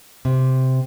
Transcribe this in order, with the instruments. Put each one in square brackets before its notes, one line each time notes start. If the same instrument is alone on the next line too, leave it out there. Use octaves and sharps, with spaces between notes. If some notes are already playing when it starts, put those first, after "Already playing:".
[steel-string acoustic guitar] C3